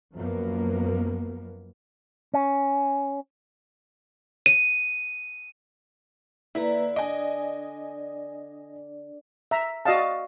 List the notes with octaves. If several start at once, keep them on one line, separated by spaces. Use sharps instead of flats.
F#2 F3 A#3 B3
C#4
D#7
D3 A#3 E4 B4 A#5
D4 D5 D#5 G#5
E5 A#5
F#4 D5 D#5 F5 A5